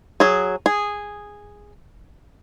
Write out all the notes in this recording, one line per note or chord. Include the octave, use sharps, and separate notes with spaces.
F#3 G#4
G#4